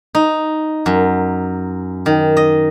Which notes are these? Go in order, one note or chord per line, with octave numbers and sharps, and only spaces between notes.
D#4
F#2
D#3
D#5